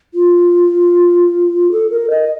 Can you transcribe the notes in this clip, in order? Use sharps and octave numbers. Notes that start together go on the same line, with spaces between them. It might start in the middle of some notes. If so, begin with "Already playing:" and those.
F4
A4
A#4
D#5